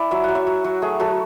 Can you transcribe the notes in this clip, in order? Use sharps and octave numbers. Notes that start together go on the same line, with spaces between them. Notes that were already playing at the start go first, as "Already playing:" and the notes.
Already playing: E4 D5 G#5
F#3 E5
F#3 F#5
C#5 E5
F#3
F#3 F#4
A3 G#4
F#3 F#4 A4